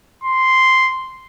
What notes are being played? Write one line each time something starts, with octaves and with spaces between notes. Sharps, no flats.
C6